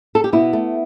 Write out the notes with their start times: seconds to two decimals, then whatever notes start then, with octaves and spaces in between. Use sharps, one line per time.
0.15 A4
0.24 G4
0.32 B2 B3 E4
0.53 A3